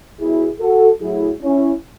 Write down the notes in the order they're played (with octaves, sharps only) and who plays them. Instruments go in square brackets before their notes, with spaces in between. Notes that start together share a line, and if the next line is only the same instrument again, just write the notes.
[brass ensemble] B2 F#3 E4 G#4
F#4 A4
A2 F#3 E4 G#4
C#4 E4